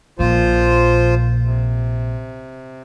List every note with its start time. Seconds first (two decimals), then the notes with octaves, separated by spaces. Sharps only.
0.19 A#1 A#2 F3 F4 C5
1.44 C3